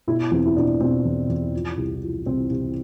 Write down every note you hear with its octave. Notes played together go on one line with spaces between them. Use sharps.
B2 E4
E2 C4
E4
B2 D4
B2 C4
E2
E2
F3
C2
F3
C2 C4
C2